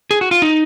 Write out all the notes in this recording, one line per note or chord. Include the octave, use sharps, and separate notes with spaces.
G#4
F#4
F4
D#4